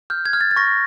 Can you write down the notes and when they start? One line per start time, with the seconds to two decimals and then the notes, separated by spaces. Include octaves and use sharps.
0.10 F6 G6
0.26 G#6
0.33 F6
0.41 A6
0.51 A6
0.56 C#6 A#6